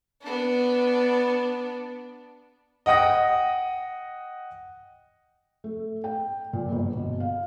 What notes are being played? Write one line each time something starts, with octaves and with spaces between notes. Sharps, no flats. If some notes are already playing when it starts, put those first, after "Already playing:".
B3 D4
D#5 F#5 G5 D#6 A#6
A3
G5
A#2
G1
B2
F5